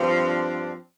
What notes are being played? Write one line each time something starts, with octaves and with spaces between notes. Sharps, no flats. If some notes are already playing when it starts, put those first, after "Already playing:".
Already playing: G2 F3 C4
D4